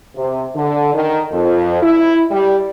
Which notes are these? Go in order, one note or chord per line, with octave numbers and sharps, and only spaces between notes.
C3
D3
D#3
F2
E4
G3